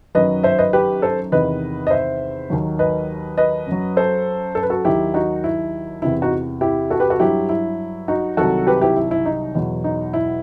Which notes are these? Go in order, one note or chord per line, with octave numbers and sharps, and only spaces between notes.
F#2 D#3 F#3 B4 D#5
C5 E5
B4 D#5
G4 B4
A4 C5
E2 C3 D#3 B4 D#5
D#5
C5 E5
D#2 D#3 F#3
B4 D#5
B4 D#5
F#2 F#3
A4 C5
A4
B4
F#4 A4
D#2 D#3 F#3 E4 G4
D#4 F#4
E4
E2 C3 E3 E4
D#4 F#4
E4 G4
F#4 A4
G4 B4
F#4 A4
G2 F#3 E4 G4
E4
D#4 F#4
C2 C3 D#3 F#3 F#4 A4
G4 B4
E4 G4
E4
E4
D#4
E2 B2 F#3
D#4
E4